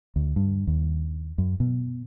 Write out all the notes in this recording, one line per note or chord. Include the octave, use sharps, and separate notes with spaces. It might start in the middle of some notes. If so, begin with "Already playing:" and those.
D2
G2
D#2
F#2
B2